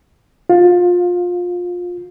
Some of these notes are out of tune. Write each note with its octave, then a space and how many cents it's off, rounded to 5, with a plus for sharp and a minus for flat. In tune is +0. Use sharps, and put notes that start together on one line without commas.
F4 +20